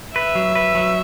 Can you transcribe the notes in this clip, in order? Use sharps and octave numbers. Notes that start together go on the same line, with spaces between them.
B4 E5
F#3
B4
F#3